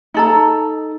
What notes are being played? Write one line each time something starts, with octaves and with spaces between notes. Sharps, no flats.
D#4 A4 A#5